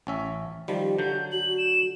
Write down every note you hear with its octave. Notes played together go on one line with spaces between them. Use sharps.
A1 C#4 E5
D#3 F3 G3 G4
D3 F#3 G6
F#4 F#7
E7